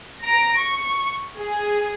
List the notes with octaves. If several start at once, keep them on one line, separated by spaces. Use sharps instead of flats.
A#5 A#6 D7
C#6
G#4